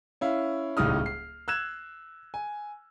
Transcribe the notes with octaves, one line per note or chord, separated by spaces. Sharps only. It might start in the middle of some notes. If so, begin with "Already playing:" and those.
C#4 E4 F5
D#1 C#2 A2 D#4 D#6 F6
C7
E6 F#6 G#6 E7
G#5